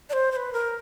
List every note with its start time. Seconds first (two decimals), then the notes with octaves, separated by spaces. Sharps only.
0.10 D5
0.13 C5
0.32 C5
0.36 B4
0.53 A#4